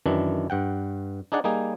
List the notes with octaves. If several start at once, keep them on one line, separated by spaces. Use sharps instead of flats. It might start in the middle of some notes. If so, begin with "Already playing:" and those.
F#2 D#3 E3 D4
G2 F#5 G5
D4 D#4 G#4 D5 F#5
G3 A#3 D#4 G#4